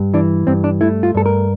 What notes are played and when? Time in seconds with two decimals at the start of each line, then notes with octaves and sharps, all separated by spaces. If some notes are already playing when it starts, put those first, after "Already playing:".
Already playing: G2
0.14 E3 D4
0.47 G2 C4
0.64 D4
0.81 A3 E4
1.03 F4
1.15 G2 A4
1.26 A#4